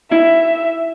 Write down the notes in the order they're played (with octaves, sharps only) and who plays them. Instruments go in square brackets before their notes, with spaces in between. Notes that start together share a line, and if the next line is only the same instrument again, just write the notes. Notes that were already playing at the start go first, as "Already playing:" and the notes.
[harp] E4 [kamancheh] E5